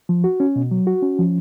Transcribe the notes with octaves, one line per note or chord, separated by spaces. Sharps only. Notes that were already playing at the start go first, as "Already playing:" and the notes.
F3
F#4
C#4
B2
F#3
F#4
C#4
F3